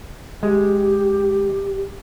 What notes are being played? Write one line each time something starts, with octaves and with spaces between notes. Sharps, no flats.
G#3 G4